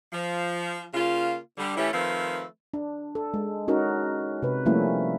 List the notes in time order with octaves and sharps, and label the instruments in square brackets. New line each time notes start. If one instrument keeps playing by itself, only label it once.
[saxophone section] F3
C#3 A#3 F4
D3 G3
E3 A3 C#4 E4 G4
D#3 F3 A3 C4 B4
[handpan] D4
A4
G#3
C#4 D#4 F#4 A#4
C3 B4
F3 G3 A3 A#3 C#4 E4